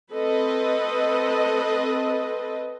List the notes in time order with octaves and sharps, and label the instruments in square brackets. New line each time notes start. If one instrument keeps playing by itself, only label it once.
[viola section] C4 A4 B4 D#5